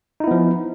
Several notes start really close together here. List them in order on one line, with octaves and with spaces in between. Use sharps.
D#4 E4 B3 F3